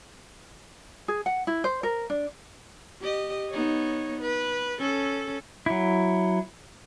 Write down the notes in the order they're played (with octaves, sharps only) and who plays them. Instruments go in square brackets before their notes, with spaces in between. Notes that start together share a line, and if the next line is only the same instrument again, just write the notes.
[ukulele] G#4
F#5
E4
C5
A#4
D4
[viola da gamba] G4 D#5
B3 D#4 C#5
B4
C#4 A4
[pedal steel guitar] F#3 E4